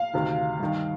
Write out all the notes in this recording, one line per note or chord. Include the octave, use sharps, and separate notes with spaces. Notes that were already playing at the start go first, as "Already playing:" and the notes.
Already playing: F5
D2 C3 D#3
G2 D#3